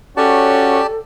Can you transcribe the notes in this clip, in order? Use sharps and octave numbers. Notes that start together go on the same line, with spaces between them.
C#4 F#4 G4 A4 D5 A5